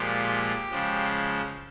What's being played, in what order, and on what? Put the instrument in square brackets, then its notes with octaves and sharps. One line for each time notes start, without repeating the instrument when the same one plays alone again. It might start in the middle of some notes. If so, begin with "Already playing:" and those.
Already playing: [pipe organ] A#2 F3 G#3 G4
C#3 F3 G#3